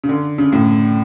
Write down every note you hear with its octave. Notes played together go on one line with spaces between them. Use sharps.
C#3
D3
C#3
A2